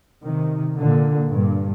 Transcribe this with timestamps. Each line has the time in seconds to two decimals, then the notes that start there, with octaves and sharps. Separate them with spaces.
0.23 C3 D#3
0.77 A#2 D3
1.31 G2 A#2